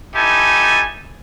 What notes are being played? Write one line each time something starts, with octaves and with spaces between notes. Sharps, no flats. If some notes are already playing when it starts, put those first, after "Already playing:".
D#4 E4 G4 A4 G#5 A5